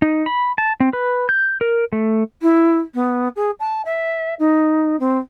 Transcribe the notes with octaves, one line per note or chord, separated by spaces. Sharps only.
D#4
B5
A5
C4
B4
G6
A#4
A3
E4
B3
G#4
A5
E5
D#4
C4